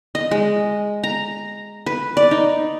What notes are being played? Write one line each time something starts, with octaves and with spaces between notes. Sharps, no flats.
D#5
G#3
A#5
B4
D5
D#4